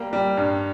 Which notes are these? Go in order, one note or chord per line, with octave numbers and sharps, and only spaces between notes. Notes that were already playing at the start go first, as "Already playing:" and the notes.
Already playing: G3 A#3
G3
G2